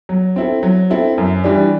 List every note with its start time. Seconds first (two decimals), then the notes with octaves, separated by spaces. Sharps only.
0.09 F#3
0.36 C4 E4 A4
0.63 F#3
0.90 C4 E4 A4
1.18 F#2
1.44 E3 G3 D4